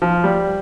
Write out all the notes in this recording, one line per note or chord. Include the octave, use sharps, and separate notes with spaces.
F3
G3